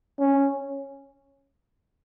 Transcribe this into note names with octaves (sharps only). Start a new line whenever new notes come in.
C#4